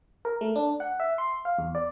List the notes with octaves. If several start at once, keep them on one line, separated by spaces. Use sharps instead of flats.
A#4
A3
D4
F#5
E5
C6
F5
E2
D5